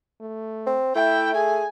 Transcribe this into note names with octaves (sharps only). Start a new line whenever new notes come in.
A3
C4
A3 E4 G5
G#4 G#5